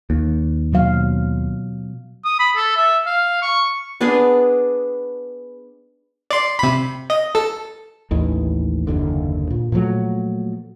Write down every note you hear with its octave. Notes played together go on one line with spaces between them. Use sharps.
D#2
B2 F#3 F5
D#6
B5
A4
E5
F5
C#6
B3 D4 G#4 B4
D5 C6
C3 B5
D#5
A4
A1 D#2 D#3 E3
F#1 D#2 D3
A#2
A#2 F3 F#3 A3